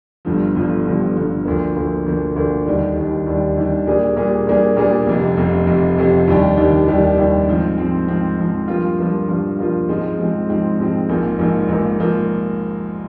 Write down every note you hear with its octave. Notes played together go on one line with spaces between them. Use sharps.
G1 G2 D3 F3
G1 G2 D3 F3
G1 G2 D3 F3
G1 G2 D3 F3
D2 D3 F3 A#3
D2 D3 F3 A#3
D2 D3 F3 A#3
D2 D3 F3 A#3
D#2 D#3 G3 D4
D#2 D#3 G3 D4
D#2 D#3 G3 D4
D#2 D#3 G3 D4
A#2 G3 A#3 D4 G#4
A#2 G3 A#3 D4 G#4
A#2 G3 A#3 D4 G#4
A#2 G3 A#3 D4 G#4
F1 F2 C3
F1 F2 C3
F1 F2 C3
F1 F2 C3
D#2 D#3 G3 D4 G4
D#2 D#3 G3 D4 G4
D#2 D#3 G3 D4 G4
D#2 D#3 G3 D4 G4
G#2 F3 C4
G#2 F3 C4
G#2 F3 C4
G#2 F3 C4
G2 F3 A#3 F4
G2 F3 A#3 F4
G2 F3 A#3 F4
G2 F3 A#3 F4
G#2 F3 G#3 C4
G#2 F3 G#3 C4
G#2 F3 G#3 C4
G#2 F3 G#3 C4
A#1 G#2 F3 A#3
A#1 G#2 F3 A#3
A#1 G#2 F3 A#3
A#1 G#2 F3 A#3